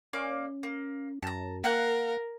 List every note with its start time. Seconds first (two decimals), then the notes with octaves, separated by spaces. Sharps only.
0.13 A#3 C#4 D5 D6
0.63 A#3
1.22 F#2 A5 A#5
1.64 A#3 A#4 F5 F#5 F#6